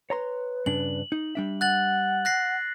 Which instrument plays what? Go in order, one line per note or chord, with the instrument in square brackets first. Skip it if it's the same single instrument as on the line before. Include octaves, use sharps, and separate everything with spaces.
[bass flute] B4 [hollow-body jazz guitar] C#5 A#5 C6
[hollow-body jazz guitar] G2 C#3 D4 [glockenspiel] F#7
[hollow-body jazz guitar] D#4
G3 D4 E5
[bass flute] F#5 [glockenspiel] F#6 A6 F#7
[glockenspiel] F#6 A#6 C7